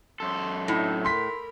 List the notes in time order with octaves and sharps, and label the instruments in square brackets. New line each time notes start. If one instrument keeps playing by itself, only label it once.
[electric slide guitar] F#2 A4 [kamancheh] C6
[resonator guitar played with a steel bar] A2 [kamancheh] D4 D#4
[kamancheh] A#4 B5 [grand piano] C6 B6